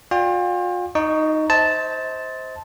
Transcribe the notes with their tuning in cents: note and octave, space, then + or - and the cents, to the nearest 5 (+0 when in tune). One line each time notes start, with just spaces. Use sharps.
F4 +40 D5 +0 G5 +35
D#4 +0 D#5 -40 C#6 +15
C5 +0 D#5 +40 A5 +0